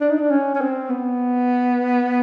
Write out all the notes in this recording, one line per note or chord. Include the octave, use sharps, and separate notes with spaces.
D4
D#4
D4
C#4
C#4
C4
B3